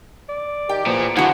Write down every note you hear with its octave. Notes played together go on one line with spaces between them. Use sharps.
D5
D#3 G4 G5
E2 A#2 F3
D3 F3 E4 F#4 F#5 G#5